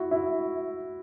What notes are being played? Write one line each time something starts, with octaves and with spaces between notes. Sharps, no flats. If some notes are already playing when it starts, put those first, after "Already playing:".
Already playing: E4 F#4
E4